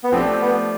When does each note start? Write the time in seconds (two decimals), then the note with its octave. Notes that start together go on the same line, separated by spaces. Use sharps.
0.04 B3
0.12 F3 A3 C4 D4 G4
0.42 B3